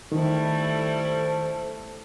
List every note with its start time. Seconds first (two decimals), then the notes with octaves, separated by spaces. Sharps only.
0.12 D#3 G3 A3 E4 A4 C5